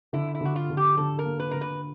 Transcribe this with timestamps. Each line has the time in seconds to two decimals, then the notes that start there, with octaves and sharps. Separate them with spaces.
0.13 D3 E4
0.35 E4
0.41 D3 F#4
0.56 F4
0.70 D3
0.77 G4
0.97 D3 A4
1.19 A#4
1.25 A#3
1.40 B4
1.51 D3 A#4
1.61 B4